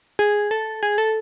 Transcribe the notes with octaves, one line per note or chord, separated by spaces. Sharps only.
G#4
A4
G#4
A4